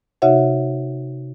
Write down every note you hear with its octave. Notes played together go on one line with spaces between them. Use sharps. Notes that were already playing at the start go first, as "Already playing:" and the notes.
C3 D#4 F#4 C#5 E5 F#5